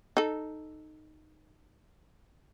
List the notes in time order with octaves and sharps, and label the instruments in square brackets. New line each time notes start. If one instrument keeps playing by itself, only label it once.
[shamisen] D#4 A4